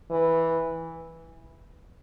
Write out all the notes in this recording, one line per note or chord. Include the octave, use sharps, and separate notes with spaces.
E3